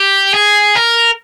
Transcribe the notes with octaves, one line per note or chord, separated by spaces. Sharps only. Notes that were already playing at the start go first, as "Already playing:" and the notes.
Already playing: G4
G#4
A#4